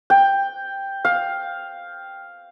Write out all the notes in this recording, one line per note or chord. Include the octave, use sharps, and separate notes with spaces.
G5
F5